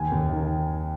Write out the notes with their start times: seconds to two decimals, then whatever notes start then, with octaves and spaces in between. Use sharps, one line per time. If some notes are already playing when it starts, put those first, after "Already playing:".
Already playing: D#2 G#5
0.12 D#2
0.29 D#3